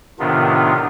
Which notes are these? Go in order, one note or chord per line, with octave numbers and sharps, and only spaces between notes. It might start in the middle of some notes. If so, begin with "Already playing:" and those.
A2 C3 D#3 B3 D4 F4